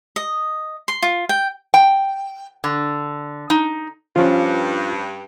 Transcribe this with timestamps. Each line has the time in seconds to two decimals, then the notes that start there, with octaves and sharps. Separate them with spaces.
0.16 D#5
0.88 C6
1.02 F4
1.29 G5
1.74 G5
2.64 D3
3.50 D#4
4.16 G2 F3 C#4 F4